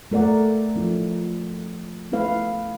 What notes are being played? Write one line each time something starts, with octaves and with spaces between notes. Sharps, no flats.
A3 A#4 D5 F#5
F3 C#4 E4
A3 C#4 E4 B4 F5